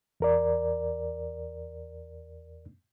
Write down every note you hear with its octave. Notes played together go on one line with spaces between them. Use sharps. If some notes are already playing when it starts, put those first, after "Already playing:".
E2 A#4 D5